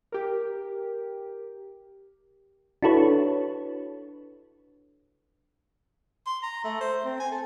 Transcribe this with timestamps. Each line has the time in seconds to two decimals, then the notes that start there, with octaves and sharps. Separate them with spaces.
0.12 G4 A#4
2.83 D4 E4 F#4 A4 B4 C#5
6.27 C6
6.43 A#5
6.64 A3
6.81 C5
7.05 C4
7.20 G#5
7.32 A4